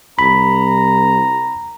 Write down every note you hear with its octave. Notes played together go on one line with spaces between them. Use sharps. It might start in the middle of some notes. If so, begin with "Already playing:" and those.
C2 A#5 B5